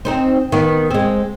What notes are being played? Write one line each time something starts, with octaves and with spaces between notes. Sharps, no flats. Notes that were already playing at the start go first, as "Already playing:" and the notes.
C4 D#4 C5
D#3 B3
G#3 C4